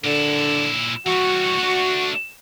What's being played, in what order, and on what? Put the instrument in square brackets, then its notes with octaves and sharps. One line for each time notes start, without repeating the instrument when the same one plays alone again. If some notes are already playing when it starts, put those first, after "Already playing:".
[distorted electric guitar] A#2 E4 [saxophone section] D3
[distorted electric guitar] E3 G3 [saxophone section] F#4
[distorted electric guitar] A3 D4